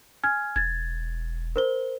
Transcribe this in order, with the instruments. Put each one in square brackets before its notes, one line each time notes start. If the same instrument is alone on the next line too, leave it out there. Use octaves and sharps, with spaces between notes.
[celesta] G#5 F6 G#6
[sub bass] E1 [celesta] G#6 A6
[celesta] A#4 C5 G7